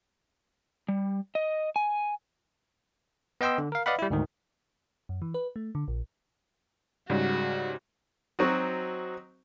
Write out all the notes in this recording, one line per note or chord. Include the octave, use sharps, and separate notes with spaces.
G3
D#5
G#5
B3 D#5 G5 C6 E6
D3
A#4 F5
B4 D5 D#5 F5 F#5 B5
G3 E4
D2 G#2 D#3
F#2
E3
B4
A3
D3
A#1
G#2 C#3 G3 F#4
F#3 C4 D#4 F#4